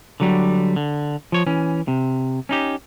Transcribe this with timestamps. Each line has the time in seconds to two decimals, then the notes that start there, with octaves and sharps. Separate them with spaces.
0.20 D3 F#3 G3
0.76 D3
1.32 F3 C#5
1.46 E3 C#4
1.88 C3
2.49 C#4 D#4 G4